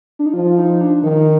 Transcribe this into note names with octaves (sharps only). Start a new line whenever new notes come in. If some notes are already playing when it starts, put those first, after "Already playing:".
D4
D#4
F3 F4
D#4
D4
D#3 D#4